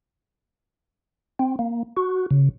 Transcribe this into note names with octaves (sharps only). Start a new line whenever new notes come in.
C4
A#3
F#4
C#3